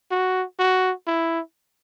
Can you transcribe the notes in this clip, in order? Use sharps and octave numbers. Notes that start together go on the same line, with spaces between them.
F#4
F#4
E4